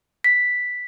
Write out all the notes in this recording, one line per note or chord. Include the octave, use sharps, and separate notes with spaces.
B6